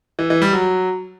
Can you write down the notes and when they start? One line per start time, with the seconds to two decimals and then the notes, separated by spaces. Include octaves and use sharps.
0.19 E3
0.30 E3
0.42 G3
0.53 F#3